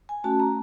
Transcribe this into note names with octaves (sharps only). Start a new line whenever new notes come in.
G#5
A3 C#4 F#4 A5
A#5